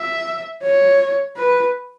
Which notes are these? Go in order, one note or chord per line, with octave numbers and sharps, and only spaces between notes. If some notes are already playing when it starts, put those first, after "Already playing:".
Already playing: E5
C#5
B4